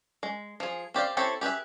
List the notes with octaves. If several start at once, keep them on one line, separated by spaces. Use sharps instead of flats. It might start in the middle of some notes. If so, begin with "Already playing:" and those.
G#3
F3 G#4
C4 G4 D5 F5
C4 E4 G4 A4 C#5
G4 G#4 B4 E5